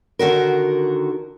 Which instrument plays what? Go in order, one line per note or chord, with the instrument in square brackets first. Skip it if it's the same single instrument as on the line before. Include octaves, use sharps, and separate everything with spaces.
[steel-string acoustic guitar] D3 D#3 F#4 A#4